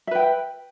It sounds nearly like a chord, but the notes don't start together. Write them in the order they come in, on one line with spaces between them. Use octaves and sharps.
E5 B4 G5